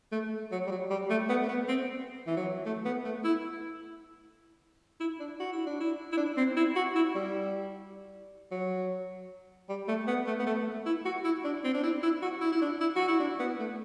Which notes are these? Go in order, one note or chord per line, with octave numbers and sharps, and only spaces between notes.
A3
F#3
G3
F#3
G3
A3
B3
A3
B3
C4
E3
F#3
A3
B3
A3
E4
E4
D4
F#4
E4
D4
E4
E4
D4
C4
E4
F#4
E4
G3
F#3
G3
A3
B3
A3
B3
A3
E4
F#4
E4
D4
C4
D4
E4
E4
F#4
E4
E4
D4
E4
F#4
E4
D4
B3
A3